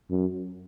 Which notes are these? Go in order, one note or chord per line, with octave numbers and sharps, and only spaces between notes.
F#2